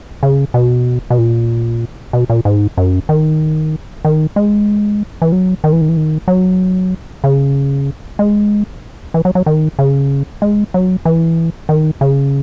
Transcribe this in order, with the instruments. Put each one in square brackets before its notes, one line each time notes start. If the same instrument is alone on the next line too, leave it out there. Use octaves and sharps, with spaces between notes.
[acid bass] C#3
B2
B2
A#2
B2
A#2
G#2
F#2
D#3
D#3
G#3
E3
F#3
D#3
E3
D#3
E3
D#3
F#3
C#3
G#3
E3
F#3
F#3
D#3
C#3
G#3
F#3
E3
D#3
C#3